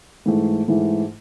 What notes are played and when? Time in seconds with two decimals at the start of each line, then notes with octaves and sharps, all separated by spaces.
0.26 G#2 E3 A3
0.68 G#2 E3 A3